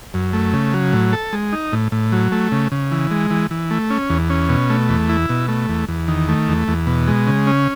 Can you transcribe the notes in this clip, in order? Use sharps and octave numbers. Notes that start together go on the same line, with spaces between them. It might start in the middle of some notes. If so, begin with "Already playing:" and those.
F#2
A3
C#3
F#3
A2
A4
G#3
D#4
A2
A2
F#3
A3
C#3
C#3
E3
G#3
E3
E3
A3
C#4
E2
C#4
B2
A3
E2
E4
B2
A3
E2
E2
D#3
A3
E2
E2
B2
G#3
C#3
C#4